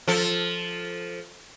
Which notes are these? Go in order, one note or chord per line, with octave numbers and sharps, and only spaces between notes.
F3 A4